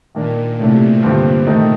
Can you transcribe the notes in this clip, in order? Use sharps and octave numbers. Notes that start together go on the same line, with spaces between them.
A#2 D#3 A#3 D4
A2 C3 A3 D4
G2 A#2 D3 F3 C4
D#3 A3 D#4